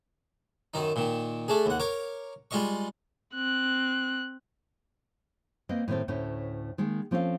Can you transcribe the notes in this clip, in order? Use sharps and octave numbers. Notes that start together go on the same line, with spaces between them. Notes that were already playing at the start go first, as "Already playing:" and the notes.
F#2 D#3 D#4
A#2 D#3
A3 D4 G#4
D#2 F#5
A#4 C#5 D6
G3 G#3 F4 D#5 C#6
C4 F#6
A#3 C4 B4 D#5
A2 D#3 C4 A4
D2 A2 A3 C#4 C5
D#3 G#3 A#3
F3 C4 C#4 A4 F5